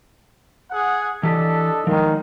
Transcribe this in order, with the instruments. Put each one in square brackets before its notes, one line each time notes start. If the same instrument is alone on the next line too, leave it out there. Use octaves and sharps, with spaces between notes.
[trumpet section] G#4 F#5
[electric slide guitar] E3 G4 [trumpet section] D4 A4 D#5
[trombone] D#3 [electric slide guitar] F3 G#3